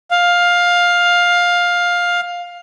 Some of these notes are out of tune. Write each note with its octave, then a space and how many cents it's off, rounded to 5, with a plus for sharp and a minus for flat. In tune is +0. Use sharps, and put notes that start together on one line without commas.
F5 +15